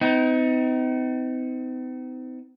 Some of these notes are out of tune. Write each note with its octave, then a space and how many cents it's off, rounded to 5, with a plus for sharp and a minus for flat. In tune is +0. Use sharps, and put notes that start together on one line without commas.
C4 -45 D#4 +25